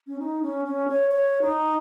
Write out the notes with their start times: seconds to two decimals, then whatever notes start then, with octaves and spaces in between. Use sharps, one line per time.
0.07 C#4
0.19 D#4
0.43 C#4
0.65 C#4
0.88 C#5
1.11 C#5
1.42 D#4